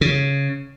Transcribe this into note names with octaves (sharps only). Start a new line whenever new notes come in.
C#3